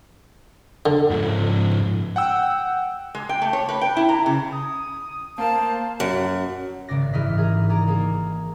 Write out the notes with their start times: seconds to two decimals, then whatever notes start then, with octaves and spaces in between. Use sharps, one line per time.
0.86 D3
1.10 G#2 F3
2.16 F#5 G5 E6
3.15 G#3
3.29 G5
3.42 A3
3.53 C#5
3.69 B4
3.81 G5
3.97 E4
4.09 A#5
4.26 C#3
4.52 D#6
5.38 A#3 C5 F5 A5
6.00 F#2
6.88 G#1 G#2 C#3 D5 A#6
7.13 G#2 E3 D#5 F6 B6
7.38 G#4 A#4
7.69 G#4 A#4 D5 A#5
7.88 A#3 D#4 G#4